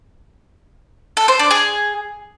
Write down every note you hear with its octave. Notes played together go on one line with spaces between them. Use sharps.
A4
C5
D4
G#4